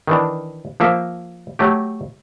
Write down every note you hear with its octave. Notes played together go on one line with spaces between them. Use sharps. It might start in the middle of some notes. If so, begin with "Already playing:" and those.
D#3 E3 D4
F3 A#3 E5
F#3 A3 G4